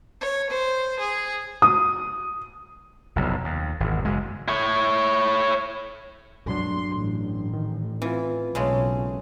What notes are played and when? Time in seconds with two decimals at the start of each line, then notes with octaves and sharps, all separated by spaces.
0.21 C#5
0.50 C5
1.00 G#4
1.62 D#6
3.16 F1 B1
3.44 D#2
3.80 G#1 E2
4.04 F#1 G#3
4.48 E4 C#5
6.48 G2 F#3 D4 C6
6.96 A1
7.54 D#3
8.02 E3 C4 F4
8.55 B1 C#3 G#3 A3